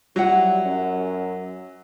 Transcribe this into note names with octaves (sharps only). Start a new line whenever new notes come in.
F#3 G3 E4 F#5
F#2